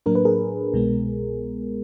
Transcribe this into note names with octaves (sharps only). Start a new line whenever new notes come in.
A2 F#3 A#3 D4 A#4
B4
G#4 A#4
C2 B2 G#3 B3